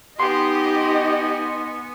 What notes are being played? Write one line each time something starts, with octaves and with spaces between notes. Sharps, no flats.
B3 D#4 G4 D#5 G#5 C6